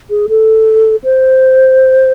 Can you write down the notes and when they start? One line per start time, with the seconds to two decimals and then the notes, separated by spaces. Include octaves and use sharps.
0.10 G#4
0.29 A4
1.04 C5